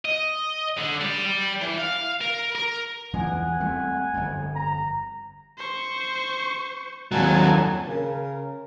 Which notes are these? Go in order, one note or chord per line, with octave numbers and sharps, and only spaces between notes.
D#5
D3
G3
G3
E3
F5
A#4
A#4
E2 E3 F3 F#5 G#5
G3 A3 C4
G1 F2
A#5
C5 C#6
D#2 F#3 G#5 A5
C#3 A#4